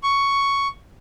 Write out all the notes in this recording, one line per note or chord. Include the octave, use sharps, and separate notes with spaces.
C#6